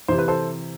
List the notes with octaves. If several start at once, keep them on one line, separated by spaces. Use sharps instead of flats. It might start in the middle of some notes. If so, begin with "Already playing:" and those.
C3 E3 C5
B4
A4 C5